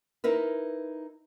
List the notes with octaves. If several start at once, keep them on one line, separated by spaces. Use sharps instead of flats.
D#4 E4 A#4 B4